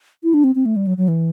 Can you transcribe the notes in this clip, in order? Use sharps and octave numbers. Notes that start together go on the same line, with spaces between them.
E4
D4
C4
C4
A3
G3
F#3
F#3
E3